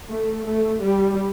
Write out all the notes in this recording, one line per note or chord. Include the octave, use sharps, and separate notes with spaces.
A3
A3
G3